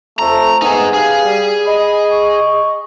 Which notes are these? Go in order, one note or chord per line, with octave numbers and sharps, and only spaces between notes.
F2 A3 A#5
B3 C4 D#4 G#4 G#5
G4 G#4 B4 F5
G3
D#5 B5
C#6